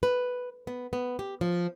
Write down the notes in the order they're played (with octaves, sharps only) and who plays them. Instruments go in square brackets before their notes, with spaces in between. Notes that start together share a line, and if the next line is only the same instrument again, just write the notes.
[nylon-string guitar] B4
B3
B3
G4
F3